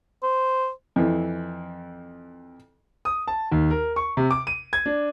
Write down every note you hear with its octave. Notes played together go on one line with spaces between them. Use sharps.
C5
F2 E3
D#6
A5
D#2
A#4
C#6
C3
D6
D#7
G#6
D4